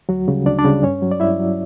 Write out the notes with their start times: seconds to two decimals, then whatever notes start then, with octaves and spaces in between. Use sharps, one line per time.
0.09 D2 F#3 F#4
0.28 C#3 G3
0.46 D2 D4 D5
0.59 D4 D5
0.65 C#3 G3
0.83 G2 C#4 C#5
1.02 F#3
1.11 D5
1.20 G2 E4 E5
1.39 F#3